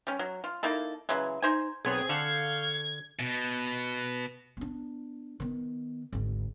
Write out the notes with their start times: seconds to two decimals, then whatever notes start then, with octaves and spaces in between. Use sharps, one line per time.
0.07 G3 C#4
0.19 F#3
0.44 F4
0.63 A#3 D#4 E4 A4
1.09 C#3 E3 F#3 G#3
1.42 D#4 C5 G#5
1.85 B1 B3 C4 G#4 C#5 G#6
2.09 D3 A4 F5 F#5 C#6 G6
3.19 B2
4.57 B3 D4
5.40 D#3 B3
6.12 G#1 D2